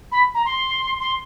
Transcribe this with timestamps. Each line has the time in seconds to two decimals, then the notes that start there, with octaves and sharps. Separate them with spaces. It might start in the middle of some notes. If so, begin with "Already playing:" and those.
0.11 B5
0.34 A#5
0.45 C6
1.00 C6